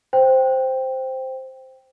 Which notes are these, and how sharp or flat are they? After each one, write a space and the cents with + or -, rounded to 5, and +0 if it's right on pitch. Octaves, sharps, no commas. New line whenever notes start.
C5 +0 G5 +0